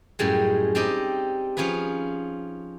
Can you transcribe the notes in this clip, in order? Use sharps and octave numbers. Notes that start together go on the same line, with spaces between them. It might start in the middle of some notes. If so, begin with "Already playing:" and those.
F#2 A2 G3 G#3
G3 C4 D#4 G4 D#5
F3 C#4 F4 G#4 B4